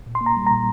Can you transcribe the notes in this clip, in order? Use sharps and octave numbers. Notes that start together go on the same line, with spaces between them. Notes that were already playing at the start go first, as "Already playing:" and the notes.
A#2
C6
A#3
A#5
G3
A#5
A#2